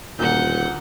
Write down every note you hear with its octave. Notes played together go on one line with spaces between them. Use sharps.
D#1 D2 A#2 F#5 G6